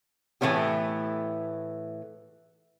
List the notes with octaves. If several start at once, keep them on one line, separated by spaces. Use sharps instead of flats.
A2 E3 A3 B3 C#4 G4